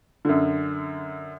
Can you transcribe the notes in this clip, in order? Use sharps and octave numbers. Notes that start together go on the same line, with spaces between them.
F#2 D3